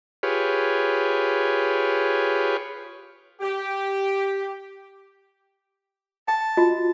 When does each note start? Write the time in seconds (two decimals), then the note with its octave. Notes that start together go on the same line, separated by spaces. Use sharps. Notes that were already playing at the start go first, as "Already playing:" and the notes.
0.23 F4 G4 G#4 B4 C#5
3.41 G4
6.28 G5 A5
6.57 F4 F#4 D#5